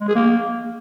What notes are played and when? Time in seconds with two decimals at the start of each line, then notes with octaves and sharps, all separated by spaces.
0.01 G#3
0.08 G#4
0.15 A#3